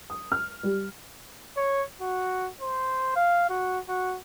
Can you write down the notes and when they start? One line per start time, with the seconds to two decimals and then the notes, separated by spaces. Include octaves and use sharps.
0.10 D#6
0.32 F6
0.63 G3
1.56 C#5
2.01 F#4
2.61 C5
3.16 F5
3.49 F#4
3.88 F#4